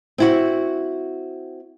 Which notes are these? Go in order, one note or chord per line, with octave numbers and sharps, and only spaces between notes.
C4 E4 F#4